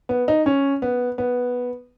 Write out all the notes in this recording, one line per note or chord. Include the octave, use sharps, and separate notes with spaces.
B3
D#4
C#4
B3
B3